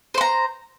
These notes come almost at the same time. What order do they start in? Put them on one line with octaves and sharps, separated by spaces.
C5 C6 A#5